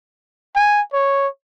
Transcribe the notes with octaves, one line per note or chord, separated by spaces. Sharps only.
G#5
C#5